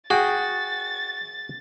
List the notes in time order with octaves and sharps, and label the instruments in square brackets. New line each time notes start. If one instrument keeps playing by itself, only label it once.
[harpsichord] F#4 [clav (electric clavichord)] G#4 G5 [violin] A6